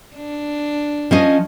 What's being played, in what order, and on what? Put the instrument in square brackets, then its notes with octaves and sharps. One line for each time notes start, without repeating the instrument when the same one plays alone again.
[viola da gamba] D4
[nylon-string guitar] F3 C#4 D#5